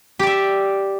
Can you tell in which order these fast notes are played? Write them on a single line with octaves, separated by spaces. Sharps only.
G4 D5 E5